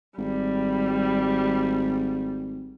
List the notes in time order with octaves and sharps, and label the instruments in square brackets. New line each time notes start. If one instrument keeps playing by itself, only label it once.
[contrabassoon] G#1 [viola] G3